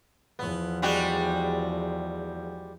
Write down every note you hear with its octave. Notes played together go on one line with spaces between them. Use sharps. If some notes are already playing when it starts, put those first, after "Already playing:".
E2 F3 B3
G3 G#3 F#4